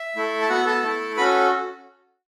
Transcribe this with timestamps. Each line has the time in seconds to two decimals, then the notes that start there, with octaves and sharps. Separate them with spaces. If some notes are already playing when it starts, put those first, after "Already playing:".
Already playing: E5
0.16 A3 E4 A4
0.42 A5
0.49 B3 F#4 A4 F#5
0.66 A4 A5
0.83 A3 E4 A4
1.17 C#4 F#4 A4 B4 B5